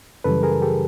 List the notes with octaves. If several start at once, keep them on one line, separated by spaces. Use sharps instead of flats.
F#2 C#3 E3 G3 A4 B4
G#4 A#4
G4 A4